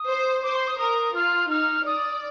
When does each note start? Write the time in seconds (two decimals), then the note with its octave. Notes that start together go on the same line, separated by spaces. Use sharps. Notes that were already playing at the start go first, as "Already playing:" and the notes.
Already playing: D#6
0.08 C5
0.43 C5 D6
0.55 C6
0.67 D#6
0.79 A#4 D#6
1.15 F4 F6
1.50 D#4 F6
1.86 D5 D#6